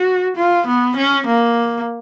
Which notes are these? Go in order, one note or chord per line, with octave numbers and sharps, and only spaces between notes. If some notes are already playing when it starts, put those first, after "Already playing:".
Already playing: F#4
F4
B3
C#4
A#3